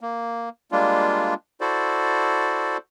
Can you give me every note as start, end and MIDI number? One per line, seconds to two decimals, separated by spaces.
0.01 0.49 58
0.72 1.34 55
0.72 1.34 56
0.72 1.34 58
0.72 1.34 62
0.72 1.34 65
1.61 2.77 64
1.61 2.77 66
1.61 2.77 69
1.61 2.77 72
1.61 2.77 74